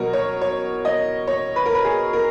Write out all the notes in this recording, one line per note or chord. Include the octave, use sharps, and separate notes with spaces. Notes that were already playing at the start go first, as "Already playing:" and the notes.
Already playing: B2 F#3 A#4
C#5
C#5
D#5
C#5
B4
A#4
B4
G#4
A#4